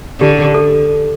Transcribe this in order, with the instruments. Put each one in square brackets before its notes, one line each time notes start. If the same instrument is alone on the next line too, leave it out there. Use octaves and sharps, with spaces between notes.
[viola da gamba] D3 [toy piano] G4
[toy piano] A4